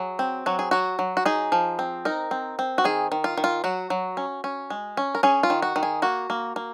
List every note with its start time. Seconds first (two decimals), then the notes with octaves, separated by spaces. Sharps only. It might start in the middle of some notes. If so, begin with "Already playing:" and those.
Already playing: F#3 G#4
0.19 C4
0.46 F#3 F#4
0.59 G#4
0.71 F#3 F#4
0.99 F#3
1.17 F#4
1.26 D#4 G#4
1.52 F3
1.79 C4
2.05 D#4 A#4
2.31 C4
2.59 C4
2.78 F#4
2.84 D#3 G#4
3.12 D#3
3.24 F4
3.37 D#3
3.44 F4
3.64 F#3 F#4
3.90 F#3
4.17 C#4
4.44 C#4
4.70 G#3
4.97 C#4
5.15 A#4
5.23 C#4 G#4
5.43 F4
5.50 D#3
5.62 F#4
5.76 D#3
5.83 G#4
6.02 A#3 F#4
6.30 A#3
6.56 A#3